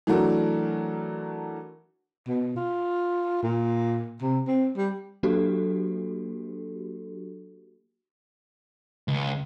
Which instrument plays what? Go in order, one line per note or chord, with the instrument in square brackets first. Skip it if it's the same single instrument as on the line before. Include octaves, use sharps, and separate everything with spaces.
[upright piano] E3 F#3 A3 D4 F#4 A#4
[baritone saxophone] B2
F4
A#2
C3
C4
G3
[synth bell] F#3 A#3 D4 F#4 G4 A4
[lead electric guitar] C#2